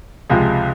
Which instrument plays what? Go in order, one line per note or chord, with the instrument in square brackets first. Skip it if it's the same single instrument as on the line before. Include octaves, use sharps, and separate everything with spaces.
[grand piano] C#2 C3 F3 G#3